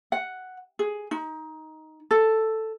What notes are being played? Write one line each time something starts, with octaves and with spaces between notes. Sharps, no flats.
F#5
G#4
D#4
A4